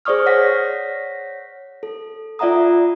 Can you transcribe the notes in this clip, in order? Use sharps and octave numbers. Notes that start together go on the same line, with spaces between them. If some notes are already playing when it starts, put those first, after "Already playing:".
G#4 C5 D5 C#6 D#6 F6
C#5 F#5 A#6 B6
A4
F4 D5 E5 F#5 A#5 D#6